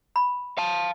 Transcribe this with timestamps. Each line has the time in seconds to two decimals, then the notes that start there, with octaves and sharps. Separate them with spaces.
0.16 B5
0.58 F5 A5